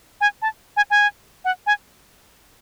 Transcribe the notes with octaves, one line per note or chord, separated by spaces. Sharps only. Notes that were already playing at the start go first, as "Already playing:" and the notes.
G#5
A5
G#5
G#5
F#5
G#5